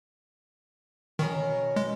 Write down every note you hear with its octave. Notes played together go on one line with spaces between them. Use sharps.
B2 D#3 C#4 A#4
G#3